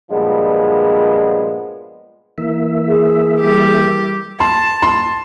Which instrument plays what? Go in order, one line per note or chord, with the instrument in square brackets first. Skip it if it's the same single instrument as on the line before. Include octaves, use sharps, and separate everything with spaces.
[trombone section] G2 A#2 F3 G#3 B3
[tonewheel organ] E3 A#3 E5
[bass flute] G#4
[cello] G3 G4
[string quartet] A5 [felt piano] C6
[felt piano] C6